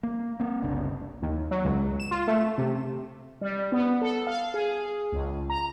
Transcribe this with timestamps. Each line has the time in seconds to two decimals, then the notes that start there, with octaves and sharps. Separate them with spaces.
0.03 A#3
0.40 A#3 C4
0.62 F#1 C2 C#3 D4
1.22 D#2
1.51 F#3
1.65 C#2
2.00 E7
2.11 F4
2.27 A3
2.58 C3
3.41 G3
3.72 B3
4.01 A4
4.27 F5
4.54 G#4
5.12 C#2
5.50 A#5